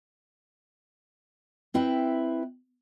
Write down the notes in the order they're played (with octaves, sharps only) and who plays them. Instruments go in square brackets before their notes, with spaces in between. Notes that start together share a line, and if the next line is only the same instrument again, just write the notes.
[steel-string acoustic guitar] C4 E4 B4 E5 G5